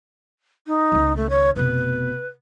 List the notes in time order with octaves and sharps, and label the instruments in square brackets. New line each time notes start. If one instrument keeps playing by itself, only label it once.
[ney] D#4
[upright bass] C#2 D#3
[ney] A3
C#5
[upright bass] F1 B2 [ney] B4